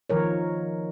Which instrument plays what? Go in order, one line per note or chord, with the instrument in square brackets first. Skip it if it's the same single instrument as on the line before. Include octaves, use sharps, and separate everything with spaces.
[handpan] D#3 F3 A#4 C#5